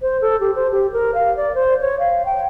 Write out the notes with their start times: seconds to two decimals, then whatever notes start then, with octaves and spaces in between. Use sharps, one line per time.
0.02 C5
0.21 A4
0.40 G4
0.55 C5
0.72 G4
0.93 A#4
1.14 F5
1.37 D5
1.55 C5
1.81 C#5
2.00 F5
2.26 G5